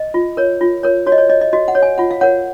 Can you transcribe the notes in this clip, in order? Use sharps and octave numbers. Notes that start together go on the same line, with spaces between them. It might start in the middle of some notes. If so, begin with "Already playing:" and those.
Already playing: D#5
F4
A#4 C#5
F4
A#4 C#5
F#4 C#5
D#5
C#5
C#5 D#5
D#5
F#4 D#5
F#5
C#5
G#5
F4 F#5
F5
A#4 C#5 F#5